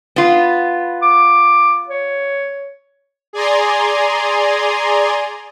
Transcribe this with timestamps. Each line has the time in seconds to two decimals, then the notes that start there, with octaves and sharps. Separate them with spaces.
0.16 B3 F4
1.02 D6
1.88 C#5
3.33 G#4 D5 G#5 A#5 C6